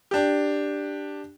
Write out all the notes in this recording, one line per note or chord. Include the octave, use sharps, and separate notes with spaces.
D4 G4